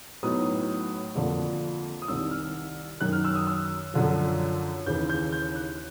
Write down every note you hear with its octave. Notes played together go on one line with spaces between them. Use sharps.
A2 F#3 B3 D#4 D#6
F2 D3 F3 A#3 D4
D#6
C2 C3 D#3 E6
F6
F#2 D#3 F#3 F#6
F6
E6
D#6
E6
F#2 D3 F3
D#2 C#3 E3 G6
G6
G6
F#6